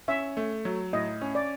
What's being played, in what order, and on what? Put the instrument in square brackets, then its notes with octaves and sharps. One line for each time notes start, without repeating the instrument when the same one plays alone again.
[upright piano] C#4 [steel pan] E5
[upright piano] A3
F#3
[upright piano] A2 [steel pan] D#5
[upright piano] C#4
[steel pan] D5